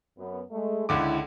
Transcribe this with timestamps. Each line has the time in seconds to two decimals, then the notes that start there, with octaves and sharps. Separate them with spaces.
0.18 F#2 B3
0.51 G#3 A3
0.89 C#2 D3 E4 D6